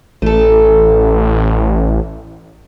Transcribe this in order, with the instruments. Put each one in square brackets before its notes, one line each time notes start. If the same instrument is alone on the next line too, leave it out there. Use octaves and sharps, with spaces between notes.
[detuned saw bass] A1 [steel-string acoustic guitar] A3 A4